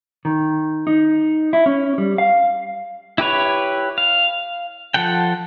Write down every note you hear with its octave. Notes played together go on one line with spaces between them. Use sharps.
D#3
D#4
E4
C#4
G3
F5
E4 G4 B4 C#5
F5
F3 A4 F#5 G5